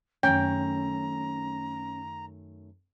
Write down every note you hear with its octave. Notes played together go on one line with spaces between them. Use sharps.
F#2 D#3 A3 C#4 G5 A#5